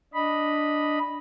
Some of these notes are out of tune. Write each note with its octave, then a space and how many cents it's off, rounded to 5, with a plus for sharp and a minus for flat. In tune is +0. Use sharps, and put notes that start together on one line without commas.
D4 +0 D#5 +0 B5 -5